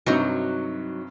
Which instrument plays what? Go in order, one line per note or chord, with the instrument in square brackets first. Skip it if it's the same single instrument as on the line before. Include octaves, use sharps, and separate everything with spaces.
[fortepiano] G2 C3 [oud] F#3 D#4 F#4